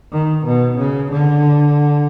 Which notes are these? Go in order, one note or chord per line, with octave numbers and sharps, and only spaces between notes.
D#3
B2
C#3
D3